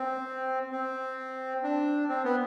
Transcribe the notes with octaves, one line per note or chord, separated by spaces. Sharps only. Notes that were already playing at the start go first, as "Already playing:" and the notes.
Already playing: C4
C4
D4
C4
B3